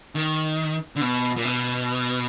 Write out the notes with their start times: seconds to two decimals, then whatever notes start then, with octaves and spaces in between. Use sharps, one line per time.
0.15 D#3
0.96 D3
1.01 B2
1.37 A#2
1.45 B2